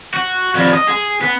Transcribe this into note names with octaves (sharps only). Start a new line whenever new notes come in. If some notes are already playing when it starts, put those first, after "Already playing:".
F#4
F2 G3
D#5
G#4
B3